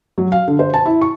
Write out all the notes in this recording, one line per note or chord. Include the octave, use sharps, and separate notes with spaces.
F#3
F5
D3
C5
A5
E4
C#6